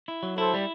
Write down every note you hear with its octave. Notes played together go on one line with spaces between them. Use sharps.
E4
F#3
E4 A4 C5
G3